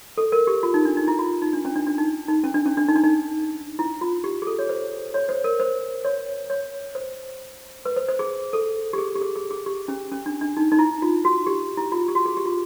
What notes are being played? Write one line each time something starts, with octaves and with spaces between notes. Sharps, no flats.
A4
A#4
G4
F4
D#4
D4
D#4
E4
F4
D#4
D4
C#4
D4
D4
D#4
D#4
C#4
D4
C#4
D4
D#4
D4
D#4
E4
F4
G4
G#4
A4
C#5
C5
C#5
C5
A#4
C5
C#5
C#5
C5
B4
C5
C5
G#4
A4
G4
G#4
G4
G#4
G#4
G#4
G4
C#4
C#4
D4
D4
D#4
D#4
E4
F4
F#4
G4
E4
F4
G4
F#4
G#4
G4
F4